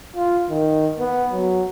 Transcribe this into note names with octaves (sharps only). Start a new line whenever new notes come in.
F4
D#3
B3
F#3